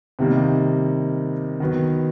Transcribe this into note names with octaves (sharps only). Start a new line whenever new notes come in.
C3 D#3 G3 A#3 D#4
D#3 F#3 B3